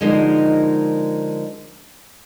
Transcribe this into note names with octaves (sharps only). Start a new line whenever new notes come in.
D3 F3 G#3 D#4 A#4